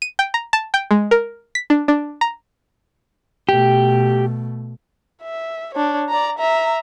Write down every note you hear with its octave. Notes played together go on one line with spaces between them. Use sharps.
D#7
G5
A#5
A5
G5
G#3
A#4
B6
D4
D4
A#5
B2 A3 G4
E5
D4 C#5
D5 A#5
E5 A#5